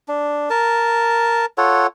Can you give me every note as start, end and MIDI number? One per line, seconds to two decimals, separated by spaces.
0.08 0.49 62
0.50 1.46 70
0.50 1.46 81
1.58 1.87 65
1.58 1.87 69
1.58 1.87 73
1.58 1.87 78